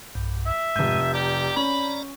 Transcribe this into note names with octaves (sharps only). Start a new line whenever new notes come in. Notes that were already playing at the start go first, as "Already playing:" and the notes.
B1 G2
E5
F1 G#2 G#3 G6
G4 D5 A#5
C#4 B5